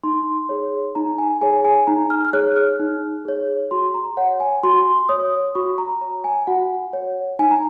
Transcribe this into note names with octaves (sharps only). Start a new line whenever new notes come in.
D#4 C6
G#4 C#5
D#4 A#5
G#5
G#4 C#5 G#5
G#5
D#4 A#5
F6
F6
G#4 C#5 F#6
F6
D#4
G#4 C#5
F#4 C6
A#5
C#5 F#5
G#5
F#4 C6
C#5 D#6
F#4 C#6
A#5
C#5 A#5
G#5
F#4 F#5
C#5
D#4 G#5
A#5